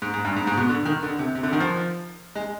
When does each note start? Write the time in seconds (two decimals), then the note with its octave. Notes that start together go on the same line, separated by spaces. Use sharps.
0.02 G#2
0.14 G#2
0.25 G2
0.36 G#2
0.47 G#2
0.57 B2
0.69 D3
0.85 D#3
1.03 D3
1.19 C3
1.35 C3
1.43 D3
1.53 D#3
1.60 F3
2.35 G#3